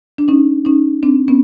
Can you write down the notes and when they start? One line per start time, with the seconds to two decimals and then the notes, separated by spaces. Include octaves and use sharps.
0.18 D4
0.28 C#4 D#4
0.65 C#4 D#4
1.03 C4 D4
1.28 B3 C#4